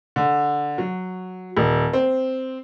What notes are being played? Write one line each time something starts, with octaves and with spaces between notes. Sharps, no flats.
D3
F#3
D#1
C4